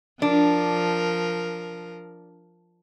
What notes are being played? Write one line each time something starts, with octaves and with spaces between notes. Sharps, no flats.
F3 D4 A#4